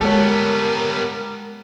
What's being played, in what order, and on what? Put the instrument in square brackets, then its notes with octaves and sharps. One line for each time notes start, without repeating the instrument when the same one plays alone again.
[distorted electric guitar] G3 B3 [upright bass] G#3 [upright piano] A4 C#5 [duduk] A#4